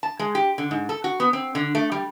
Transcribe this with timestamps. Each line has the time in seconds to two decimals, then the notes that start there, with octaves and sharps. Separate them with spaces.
0.03 A5
0.19 G#3
0.35 G4
0.58 D3
0.71 G#2
0.89 A4
1.04 F#4
1.20 B3
1.33 C4
1.55 D3
1.75 A3
1.92 G3